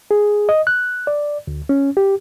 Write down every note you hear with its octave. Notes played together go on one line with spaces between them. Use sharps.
G#4
D#5
F#6
D5
D2
C#4
G4